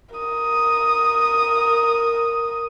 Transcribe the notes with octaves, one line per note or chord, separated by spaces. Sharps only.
A#4 D#6